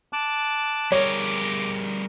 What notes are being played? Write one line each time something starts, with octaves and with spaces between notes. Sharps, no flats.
A5 D6 F#6
G3 G#4 A#4 C#5 D6